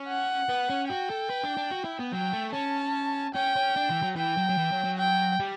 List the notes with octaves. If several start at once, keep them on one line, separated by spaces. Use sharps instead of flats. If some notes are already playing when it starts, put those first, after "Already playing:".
Already playing: C#4
F#5
B3
C#4
F#4 G5
A4
B4
D4
D4
F#4
E4
B3
F#3 G5
A3
C#4 A5
C#4 G5
C#4
D4
E3
F#3
E3 G5
F#3
F#3
E3
F#3
F#3
G5
G3